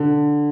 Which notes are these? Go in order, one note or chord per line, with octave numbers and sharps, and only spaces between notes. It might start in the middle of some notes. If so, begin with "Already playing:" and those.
Already playing: D3